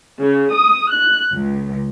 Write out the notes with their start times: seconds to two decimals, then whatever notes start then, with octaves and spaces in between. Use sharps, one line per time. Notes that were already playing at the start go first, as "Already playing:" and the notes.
0.21 C#3
0.54 D#6
0.92 F#6
1.33 C#2